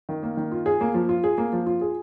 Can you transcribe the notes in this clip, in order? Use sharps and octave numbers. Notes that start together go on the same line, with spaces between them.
D#3
A#3
D#3
F4
G#4
A#3
F3
F4
G#4
A#3
F3
F4
G#4